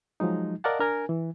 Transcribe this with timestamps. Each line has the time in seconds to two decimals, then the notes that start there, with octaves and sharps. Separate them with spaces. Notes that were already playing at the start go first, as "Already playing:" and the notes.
0.20 F3 F#3 G#3 D#4
0.64 A#4 D5 D#5 F5 F#5 A5
0.79 D4 A#4 G#5
1.09 E3